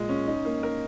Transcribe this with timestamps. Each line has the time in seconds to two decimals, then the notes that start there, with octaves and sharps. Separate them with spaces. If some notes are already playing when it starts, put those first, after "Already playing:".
Already playing: A#2 G#3
0.09 C#4
0.27 D#4
0.45 A#3
0.63 A#4